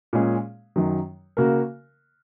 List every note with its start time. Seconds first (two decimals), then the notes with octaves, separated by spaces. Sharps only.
0.13 A#2 G#3 C#4 G#4
0.76 F#2 D#3 F#3
1.37 C#3 A#3 F#4 A#4